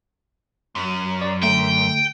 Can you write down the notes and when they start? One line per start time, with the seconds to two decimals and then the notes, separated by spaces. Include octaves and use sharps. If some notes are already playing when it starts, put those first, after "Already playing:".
0.75 F#2
1.22 D5
1.43 D3 A3 G5